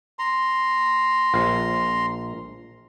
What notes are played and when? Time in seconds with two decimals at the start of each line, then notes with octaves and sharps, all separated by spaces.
0.19 A#5 C6
1.33 A#1 F5